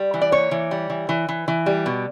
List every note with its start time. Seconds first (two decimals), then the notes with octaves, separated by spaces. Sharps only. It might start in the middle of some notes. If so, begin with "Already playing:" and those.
Already playing: G3
0.14 E3
0.21 D5
0.32 A#3 C#5
0.51 E3
0.71 G3
0.90 E3
1.09 E3
1.29 E3
1.48 E3
1.66 G3
1.86 B2